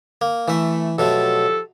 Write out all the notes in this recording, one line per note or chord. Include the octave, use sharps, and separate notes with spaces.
A#3
E3 A3 E5
B2 F3 F#3 A3 G4 A4